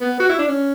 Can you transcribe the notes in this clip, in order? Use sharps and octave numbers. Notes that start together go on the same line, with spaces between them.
B3
F#4
E4
D4
C#4